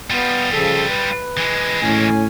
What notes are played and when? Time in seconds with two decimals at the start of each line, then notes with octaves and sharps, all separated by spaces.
0.10 G3 B3 F4
0.52 C#3 F3 A4
0.89 B4
1.37 E3 G#3
1.83 A2 C#4 G#5